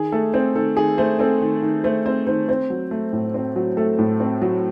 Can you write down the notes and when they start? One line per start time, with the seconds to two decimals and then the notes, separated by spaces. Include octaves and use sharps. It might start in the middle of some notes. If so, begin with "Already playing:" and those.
Already playing: D#3 G#4
0.12 A3 A4
0.34 C4 C5
0.55 D#3 A4
0.77 D#3 G#4
0.98 A3 C5
1.19 C4 A4
1.41 D#3
1.62 D#3
1.84 A3 C5
2.06 C4 C5
2.27 D#3 C5
2.49 C4 C5
2.70 F#3
2.91 A3
3.13 A2
3.34 C4
3.56 F#3
3.77 A3 A4
3.99 A2
4.20 C4
4.42 F#3